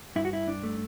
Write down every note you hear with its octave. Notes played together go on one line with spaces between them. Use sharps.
G2 E4
F#4
E4
D4
A3